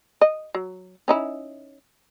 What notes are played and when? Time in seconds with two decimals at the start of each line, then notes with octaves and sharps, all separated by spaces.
0.21 D#5
0.55 F#3
1.08 C#4 D#4 E4